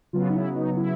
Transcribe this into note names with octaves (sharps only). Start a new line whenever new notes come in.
C#3 F#3 B3 F4
D#4
E4
D#4
E4